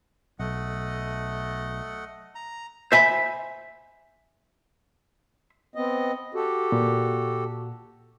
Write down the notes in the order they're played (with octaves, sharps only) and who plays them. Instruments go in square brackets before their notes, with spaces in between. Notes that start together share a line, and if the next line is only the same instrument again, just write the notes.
[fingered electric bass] B1 [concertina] A3 D#5 F#5
[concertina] A#5
[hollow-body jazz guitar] C5 E5 G#5 B5
[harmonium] B3 C4 D#5
F#4 G4 A4
[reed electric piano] A#2